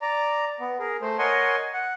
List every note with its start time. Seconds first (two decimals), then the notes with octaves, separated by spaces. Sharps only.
0.02 D5 A#5
0.60 B3
0.79 G#4 A#4
1.02 A3 C5
1.18 A#4 C#5 D#5 F#5 G#5 C6
1.73 F#5